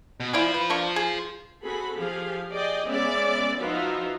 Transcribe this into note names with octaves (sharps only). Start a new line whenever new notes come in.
B2
E4 F4 C5 D5 G#5
B4
A#3 D4 C#6
G#4
C4 F#4 G#4 A4 B5
F3 G4 G#4 F5
G#4 D5 D#5 G5
G#3 B3 C#4 D5 E5
F3 D#4 F4 F#4 B4 E5